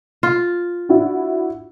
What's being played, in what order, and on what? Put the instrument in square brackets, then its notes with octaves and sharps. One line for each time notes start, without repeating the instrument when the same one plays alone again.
[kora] F4
[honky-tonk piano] D4 E4 F#4